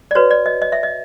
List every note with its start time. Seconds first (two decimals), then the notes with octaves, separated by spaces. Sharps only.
0.11 D5
0.15 F#4 B4 C#5
0.31 D5
0.46 D#5
0.62 D#5
0.72 E5
0.83 D#5